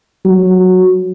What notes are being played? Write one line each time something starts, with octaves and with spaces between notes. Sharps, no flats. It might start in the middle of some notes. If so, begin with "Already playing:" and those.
F#3